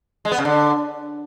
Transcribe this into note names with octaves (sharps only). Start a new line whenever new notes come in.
G#3
B3
C#3
D3